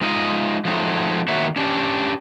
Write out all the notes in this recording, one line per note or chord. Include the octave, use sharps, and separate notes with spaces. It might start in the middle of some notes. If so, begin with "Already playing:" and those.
G#3 D#4 F4 D#5
F3 F#3 G#3 A3 C4 D#4
D#3 A#3 F#4 C#5 E5 F#5
C#4 D4 G4